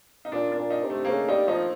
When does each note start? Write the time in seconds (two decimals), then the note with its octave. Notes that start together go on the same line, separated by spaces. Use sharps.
0.25 D#4
0.32 A#2 D4
0.52 D4
0.58 A#2
0.70 D#4
0.84 C3
0.90 A3
1.05 A#3
1.09 C#3 A3
1.29 G3 D#4
1.48 F3 D#4